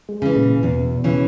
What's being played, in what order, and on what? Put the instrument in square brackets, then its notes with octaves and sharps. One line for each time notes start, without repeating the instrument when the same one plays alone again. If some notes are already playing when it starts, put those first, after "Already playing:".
[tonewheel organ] G#3
[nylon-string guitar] C#3 E3
[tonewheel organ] A#2
C#3
[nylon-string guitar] E2 [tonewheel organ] B2
[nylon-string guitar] C#3 E3